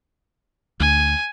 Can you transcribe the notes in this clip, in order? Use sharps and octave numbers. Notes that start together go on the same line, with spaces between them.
D2 G#5